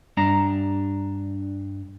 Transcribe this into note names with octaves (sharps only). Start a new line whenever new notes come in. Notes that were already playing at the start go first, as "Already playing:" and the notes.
G2 D4 A#5